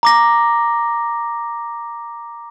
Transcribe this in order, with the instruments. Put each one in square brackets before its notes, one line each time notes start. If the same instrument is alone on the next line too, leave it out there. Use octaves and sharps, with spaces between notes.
[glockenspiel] A#5 D6 A#6